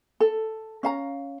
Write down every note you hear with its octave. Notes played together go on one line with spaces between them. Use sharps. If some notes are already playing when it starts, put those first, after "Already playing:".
A4
C#4 F5 A#5